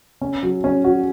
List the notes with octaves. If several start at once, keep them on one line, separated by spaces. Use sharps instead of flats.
C#4
F#3
C#4
F#4